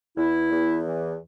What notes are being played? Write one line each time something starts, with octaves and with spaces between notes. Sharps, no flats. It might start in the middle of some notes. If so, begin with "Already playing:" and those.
E2 E4
E2
E3